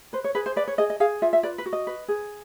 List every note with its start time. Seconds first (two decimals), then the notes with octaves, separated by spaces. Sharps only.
0.13 B4 C5
0.24 C#5
0.35 G#4 B4
0.46 C5
0.56 B4 D5
0.68 C#5
0.78 G#4 D#5
0.90 D#5
1.00 G#4 F5
1.22 F4 E5
1.33 E5
1.43 B4 D5
1.58 B4
1.66 F#4
1.73 D#5
1.87 B4
2.08 G#4